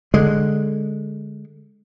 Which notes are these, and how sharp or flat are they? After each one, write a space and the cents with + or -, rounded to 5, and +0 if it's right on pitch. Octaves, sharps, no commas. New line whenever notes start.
D3 +0 G#3 +0